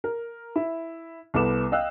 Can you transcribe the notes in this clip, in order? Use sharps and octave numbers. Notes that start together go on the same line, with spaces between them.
A#4
E4
C2 B3 A4 D6 E7
D#5 F5 G5 E6 F#6